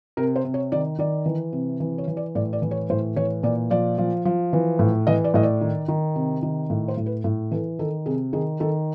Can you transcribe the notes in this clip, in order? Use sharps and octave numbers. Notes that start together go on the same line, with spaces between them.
C3 A#4
C5
C3
C#5
D#3 D5
D#3 D5
E3
C3
E3
C#5
E3
D5
A2 D5
D5
E3
C#5
A2 C5
E3 C#5
A#2 D5
F3 D5
F3
F3
E3
A2
E3 D#5
D5
A2 D#5
D5
D#3
D#3
C3
D#3
A2
C5
A2
B4
A2
E3 A4
D#3 A4
C3 G#4
D#3 G#4
D#3 A4